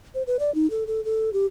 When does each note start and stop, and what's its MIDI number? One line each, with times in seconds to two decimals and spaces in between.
0.15 0.23 72
0.27 0.37 71
0.39 0.53 74
0.55 0.69 63
0.70 0.84 69
0.87 1.03 69
1.05 1.30 69
1.33 1.46 67